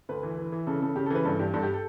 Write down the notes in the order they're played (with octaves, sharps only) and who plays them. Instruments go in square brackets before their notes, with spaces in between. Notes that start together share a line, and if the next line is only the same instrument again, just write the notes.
[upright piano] D2 B4
E3
E3
E3
C#3 A4
C#3 A4
C#3 G4
A4
E3 B4
G2 A4
G2 G4
G2 A4
G4
A4